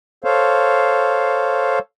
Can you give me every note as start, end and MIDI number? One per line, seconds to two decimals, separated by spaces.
0.24 1.79 69
0.24 1.79 72
0.24 1.79 73
0.24 1.79 77